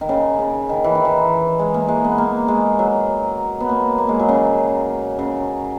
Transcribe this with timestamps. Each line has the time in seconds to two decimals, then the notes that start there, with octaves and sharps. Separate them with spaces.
0.01 D#3
0.09 C#3
0.39 C#3
0.69 D#3
0.84 E3
0.95 D#3
1.05 E3
1.59 G#3
1.74 A#3
1.88 G#3
2.04 B3
2.18 A#3
2.48 G#3
2.79 F#3
3.60 B3
3.69 A#3
3.98 A#3
4.09 G#3
4.19 F#3
4.29 C#3
5.19 C#3